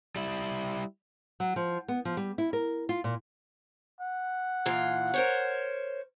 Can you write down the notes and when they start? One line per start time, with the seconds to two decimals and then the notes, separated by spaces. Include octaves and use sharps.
0.16 G3 E4
1.40 F#3
1.56 F3
1.88 B3
2.05 F3
2.17 G3
2.38 E4
2.53 A#4
2.89 F4
3.04 A#2
4.01 F#5
4.66 A#2 E3 F4
5.14 A#4 C5 C#5